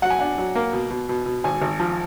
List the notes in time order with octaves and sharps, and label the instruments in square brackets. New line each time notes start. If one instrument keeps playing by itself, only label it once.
[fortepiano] F#3 [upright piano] F#5
[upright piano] G#5
[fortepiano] D4 [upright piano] F#5
[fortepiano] F#3
A#3
B2
B2
B2
B2
[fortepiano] G#1 [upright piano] G#5
[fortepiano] G#1
F3